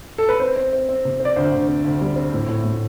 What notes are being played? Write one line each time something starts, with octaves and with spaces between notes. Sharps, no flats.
A4
B4
C4 C5
C4
C4
C4
C3
C4
D5
D2 C5
D2
C4
D2
G3
C4
A2
A2
A2